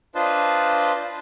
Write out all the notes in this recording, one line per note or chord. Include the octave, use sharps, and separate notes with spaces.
D4 F4 B4 C5 D#5 A5